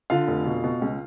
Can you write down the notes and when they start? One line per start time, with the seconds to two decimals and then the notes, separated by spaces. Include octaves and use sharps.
0.10 D3 F4 F5
0.28 F1
0.46 B2
0.64 B2
0.82 C#2